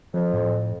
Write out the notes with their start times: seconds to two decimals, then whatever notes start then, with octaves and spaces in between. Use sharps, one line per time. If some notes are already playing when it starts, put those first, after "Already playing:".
0.14 F2 F3
0.34 A2